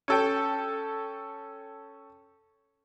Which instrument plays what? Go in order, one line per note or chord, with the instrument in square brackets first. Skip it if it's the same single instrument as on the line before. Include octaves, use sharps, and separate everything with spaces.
[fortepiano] C#4 A4 G5